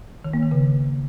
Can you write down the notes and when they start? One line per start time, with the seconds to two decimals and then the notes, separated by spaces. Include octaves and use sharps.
0.25 D#3
0.33 A#3
0.42 D#3
0.51 C#3